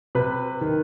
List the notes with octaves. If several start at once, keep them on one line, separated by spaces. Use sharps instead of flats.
C3 B4
D#3